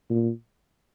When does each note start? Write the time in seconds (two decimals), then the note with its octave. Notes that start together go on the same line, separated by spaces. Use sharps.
0.10 A#2